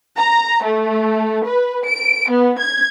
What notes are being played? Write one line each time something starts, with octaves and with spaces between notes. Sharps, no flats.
A#5
A3
B4
D7
B3
G#6